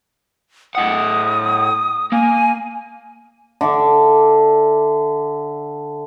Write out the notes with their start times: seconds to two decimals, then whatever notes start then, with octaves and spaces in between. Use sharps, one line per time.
0.75 A2 F#5 D#6
2.12 A#3 G#5
3.61 D3 E5 D6